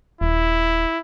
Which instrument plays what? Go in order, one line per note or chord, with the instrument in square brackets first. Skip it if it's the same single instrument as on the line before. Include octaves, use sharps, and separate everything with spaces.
[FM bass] D#1 [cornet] E4